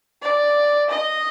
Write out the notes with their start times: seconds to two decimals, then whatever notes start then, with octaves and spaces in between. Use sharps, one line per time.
0.22 D5
0.90 D#5